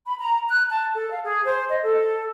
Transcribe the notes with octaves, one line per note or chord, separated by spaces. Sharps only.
B5
A#5
F#6
A5
A4
F5
G#4
C5
D#5
A4